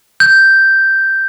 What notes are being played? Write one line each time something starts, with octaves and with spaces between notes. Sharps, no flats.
G6